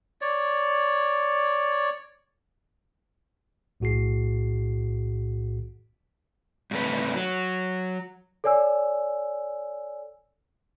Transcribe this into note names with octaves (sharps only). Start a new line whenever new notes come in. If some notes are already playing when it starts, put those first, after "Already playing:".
C#5 D5
B1 A2 F#4 G#4 C7
G2 C3 A3 B4
F#3
A4 C#5 D5 G#5 E6